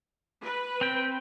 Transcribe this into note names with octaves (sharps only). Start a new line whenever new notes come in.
B4
C4 G5